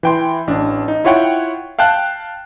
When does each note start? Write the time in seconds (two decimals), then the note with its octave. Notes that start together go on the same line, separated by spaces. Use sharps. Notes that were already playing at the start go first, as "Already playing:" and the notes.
0.03 E3 G5 C6
0.47 A1 D4
0.88 D#4
1.04 E4 F4 C#5 F#5 G5
1.79 F5 G5 A5 F#6